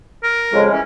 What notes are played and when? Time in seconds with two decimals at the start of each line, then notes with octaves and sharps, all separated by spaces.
0.23 A#4
0.53 F2 C#3 G#3
0.70 E3 G#3 C#4